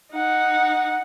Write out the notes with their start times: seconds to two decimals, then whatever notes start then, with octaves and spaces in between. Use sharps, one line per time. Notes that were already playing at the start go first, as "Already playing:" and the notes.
0.12 D#4 F#5